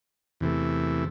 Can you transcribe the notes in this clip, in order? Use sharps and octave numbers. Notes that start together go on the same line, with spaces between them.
E2 C3 E3 A3